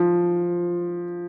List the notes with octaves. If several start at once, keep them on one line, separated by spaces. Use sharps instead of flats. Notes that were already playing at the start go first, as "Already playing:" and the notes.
Already playing: F3